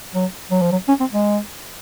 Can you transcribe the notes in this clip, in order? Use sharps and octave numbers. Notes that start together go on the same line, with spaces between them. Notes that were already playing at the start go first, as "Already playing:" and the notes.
F#3
F#3
F3
F#3
C#4
C4
G#3